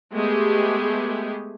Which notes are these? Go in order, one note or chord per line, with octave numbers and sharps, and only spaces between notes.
G#3 A3 B3 G4 G#4